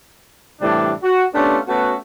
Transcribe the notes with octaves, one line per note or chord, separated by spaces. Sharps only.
A2 C3 E3 G3 D4
F#4
A3 B3 C#4 D4 F4 G4
A3 B3 C#4 F#4